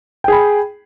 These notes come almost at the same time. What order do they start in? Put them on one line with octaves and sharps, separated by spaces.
G5 G#4 B5